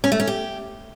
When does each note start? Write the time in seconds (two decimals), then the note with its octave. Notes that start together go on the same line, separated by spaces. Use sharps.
0.04 C#4
0.12 A3
0.20 C#4
0.27 G4